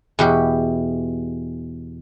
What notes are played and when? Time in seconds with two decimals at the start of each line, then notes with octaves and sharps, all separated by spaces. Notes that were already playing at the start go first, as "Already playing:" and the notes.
0.19 E2 B2 G4